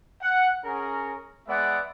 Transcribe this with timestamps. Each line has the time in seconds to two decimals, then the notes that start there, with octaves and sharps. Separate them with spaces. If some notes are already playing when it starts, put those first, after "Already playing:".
0.22 F#5
0.65 C#4 G#4 A#4 A#5
1.48 G#3 B3 D5 E5 F#5